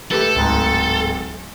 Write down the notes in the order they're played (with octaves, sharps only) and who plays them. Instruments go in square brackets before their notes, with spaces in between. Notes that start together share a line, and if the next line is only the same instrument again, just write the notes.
[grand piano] A3 G4 B4 [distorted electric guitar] A4
[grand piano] D1 G#2